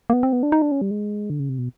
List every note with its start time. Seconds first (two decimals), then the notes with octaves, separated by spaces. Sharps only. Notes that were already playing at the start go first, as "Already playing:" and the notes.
0.10 A#3
0.13 B3
0.23 C4
0.33 B3
0.43 D4
0.52 D#4
0.62 D4
0.72 C#4
0.81 G3
0.91 G#3
1.30 D3
1.40 C#3
1.49 C3
1.59 B2